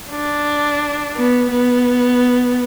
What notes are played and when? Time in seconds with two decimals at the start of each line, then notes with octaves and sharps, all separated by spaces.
0.11 D4
1.16 B3
1.51 B3